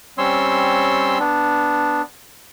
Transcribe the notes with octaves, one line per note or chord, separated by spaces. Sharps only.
G3 C4 C#4 C#5 C6 E6
B3 D4